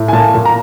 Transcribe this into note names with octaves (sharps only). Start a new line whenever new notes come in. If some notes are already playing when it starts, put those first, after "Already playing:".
Already playing: A2
G#5
A#2 A5
A#2
A#5